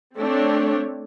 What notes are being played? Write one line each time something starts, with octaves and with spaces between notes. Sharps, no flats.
A3 C4 D4 C#5